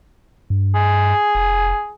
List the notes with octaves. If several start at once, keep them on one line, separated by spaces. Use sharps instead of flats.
G2
G#4
F1